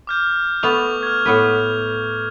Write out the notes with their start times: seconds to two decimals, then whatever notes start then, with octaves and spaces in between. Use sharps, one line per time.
0.07 D6 F6 G6
0.63 A3 B3 C#6 F7
1.03 F6 G#6
1.25 A2 B3 B4